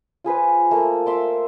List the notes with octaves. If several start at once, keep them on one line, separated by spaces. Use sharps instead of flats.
F4 G#4 B4 C5
A3 A#3 A#4
E5 C6 D6